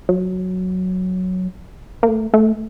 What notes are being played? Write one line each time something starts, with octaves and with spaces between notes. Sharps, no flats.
F#3
A#3
A3
A3